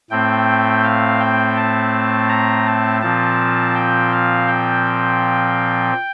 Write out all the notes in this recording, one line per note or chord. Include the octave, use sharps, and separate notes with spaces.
A2 A3 C4 G5
F5
G5
A5
A#5
A5
A#2 F3 C4 A5
G5
F5
G5